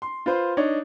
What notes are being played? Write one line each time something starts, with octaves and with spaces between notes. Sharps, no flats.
C6
F4 B4 C5 C6
D4 D#4 C#5